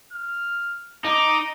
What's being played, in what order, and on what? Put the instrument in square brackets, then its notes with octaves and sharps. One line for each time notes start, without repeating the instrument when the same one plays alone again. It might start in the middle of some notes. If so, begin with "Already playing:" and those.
[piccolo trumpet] F6
[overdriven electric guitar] D#4 [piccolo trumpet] D6